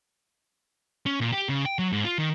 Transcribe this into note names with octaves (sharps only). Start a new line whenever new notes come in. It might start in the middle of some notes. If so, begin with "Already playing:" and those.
C#4
A#2
G4
C#3
G5
F#3
G#2
F4
D#3